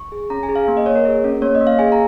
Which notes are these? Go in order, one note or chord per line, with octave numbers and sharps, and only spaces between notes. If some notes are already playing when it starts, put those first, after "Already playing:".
Already playing: C#6
G#4
C#4 A#5
G#5
G#4
F5
A#3
D#5
A#3 C#5
A#4
G#4
C#4
A#3 C#5
D#5
A#3
F5
G#4 G#5
A#5